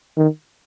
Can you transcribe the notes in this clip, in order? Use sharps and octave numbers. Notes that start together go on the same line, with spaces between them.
D#3